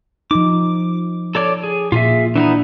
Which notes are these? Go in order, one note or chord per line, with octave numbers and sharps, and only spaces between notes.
F3 D#4 D6
A4 C#5 D5
G#4
A#2 F4 G#4 E5
E3 B3 D4 D#4